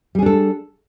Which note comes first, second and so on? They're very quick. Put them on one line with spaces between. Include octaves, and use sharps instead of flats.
G3 G#4 D4 A4